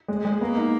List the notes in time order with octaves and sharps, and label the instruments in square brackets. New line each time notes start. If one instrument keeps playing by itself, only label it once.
[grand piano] G#3
G#3
[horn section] A#3 [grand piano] B3
[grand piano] D#4